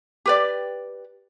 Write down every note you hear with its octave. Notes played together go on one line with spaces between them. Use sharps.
G4 B4 D5